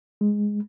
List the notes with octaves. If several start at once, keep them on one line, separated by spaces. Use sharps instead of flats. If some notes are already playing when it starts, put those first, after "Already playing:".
G#3